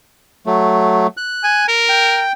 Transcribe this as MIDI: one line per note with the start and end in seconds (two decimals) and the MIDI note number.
0.46 1.07 54
0.46 1.07 57
1.17 1.64 90
1.43 1.66 80
1.68 2.23 70
1.89 2.32 79